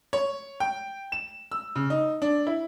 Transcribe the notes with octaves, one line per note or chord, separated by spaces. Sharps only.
C#5
G5
E7
E6
C#3
D#4
D4
E4